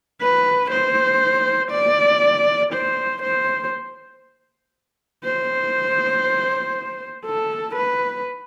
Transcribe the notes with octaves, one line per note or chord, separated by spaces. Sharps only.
B4
C5
D5
C5
C5
C5
A4
B4